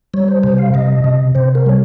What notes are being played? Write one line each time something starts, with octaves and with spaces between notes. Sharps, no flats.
G3 C#5
C5
C3 C5
F5
C3 D#5
C3
C3 C5
A#4
G3 C#5